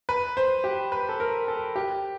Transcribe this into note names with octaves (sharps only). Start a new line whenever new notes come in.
B4
C5
G4
B4
A4
A#4
A4
G4